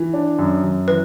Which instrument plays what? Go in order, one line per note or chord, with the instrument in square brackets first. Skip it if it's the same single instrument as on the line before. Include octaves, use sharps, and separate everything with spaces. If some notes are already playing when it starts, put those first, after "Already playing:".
Already playing: [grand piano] E3
D4
F#2
F#2
[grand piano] E3 [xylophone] B4